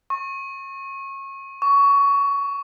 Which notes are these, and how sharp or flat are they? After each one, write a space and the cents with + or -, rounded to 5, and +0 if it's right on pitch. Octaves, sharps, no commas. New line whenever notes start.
C#6 -25
C#6 +20